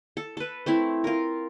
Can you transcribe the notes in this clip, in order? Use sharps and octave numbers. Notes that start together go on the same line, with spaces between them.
A4
A4 B4
A3 C4 E4
F4 A#4